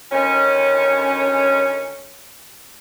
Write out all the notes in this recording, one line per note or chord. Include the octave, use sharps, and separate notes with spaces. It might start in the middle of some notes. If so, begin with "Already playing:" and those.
D2 D#3 C#4